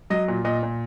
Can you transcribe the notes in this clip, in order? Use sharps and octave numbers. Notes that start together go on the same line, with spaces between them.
F#3 D#5
A#2
A#2 D#5
A#2